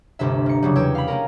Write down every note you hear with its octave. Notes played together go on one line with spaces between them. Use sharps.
G1 D2 C3 E5
A#3 C#7
C#3 F#3 G3
E2 C#5 G5 E6
F5 B5
A#3 C#4 A#4